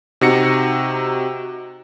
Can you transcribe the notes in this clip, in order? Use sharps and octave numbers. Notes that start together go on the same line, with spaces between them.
C3 D#4 F#4 A#6 C#7